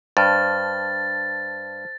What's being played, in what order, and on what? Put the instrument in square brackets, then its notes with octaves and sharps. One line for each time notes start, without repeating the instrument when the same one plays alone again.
[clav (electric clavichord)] G2 [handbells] C5 A5 F6 [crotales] A6